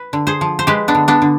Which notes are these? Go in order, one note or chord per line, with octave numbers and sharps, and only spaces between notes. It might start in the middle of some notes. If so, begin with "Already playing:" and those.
Already playing: B4
D3
G#4 C5
F3
C5
G#3 G4 B4
B3 D4
D3
B3 D4
D3